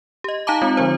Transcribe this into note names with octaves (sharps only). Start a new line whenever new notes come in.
G4 D#5
D#4 F5 A5 A#5 D6
G#3 C4 F4
D3 F3 F4 C5